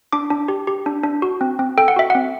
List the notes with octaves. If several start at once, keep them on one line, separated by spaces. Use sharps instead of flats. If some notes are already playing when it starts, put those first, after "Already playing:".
D4 D6
D4
G4
G4
D4
D4
F#4
C4
C4
A4 G5
F#5
F#4 E5
F#5
C4